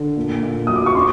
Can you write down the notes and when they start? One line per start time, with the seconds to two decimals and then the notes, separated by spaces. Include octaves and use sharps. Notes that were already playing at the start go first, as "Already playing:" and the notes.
Already playing: D3
0.16 A#2
0.43 A#2
0.67 F#3 D#6
0.76 D6
0.86 C#6
0.95 C#4 C6